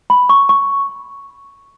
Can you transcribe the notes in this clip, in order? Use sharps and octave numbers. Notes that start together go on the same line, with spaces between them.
B5
C#6
C#6